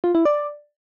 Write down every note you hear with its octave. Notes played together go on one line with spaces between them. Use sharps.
F4
E4
D5